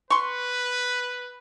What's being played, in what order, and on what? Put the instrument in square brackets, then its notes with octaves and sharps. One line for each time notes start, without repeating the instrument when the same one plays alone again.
[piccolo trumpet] B4 [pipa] C6 C#6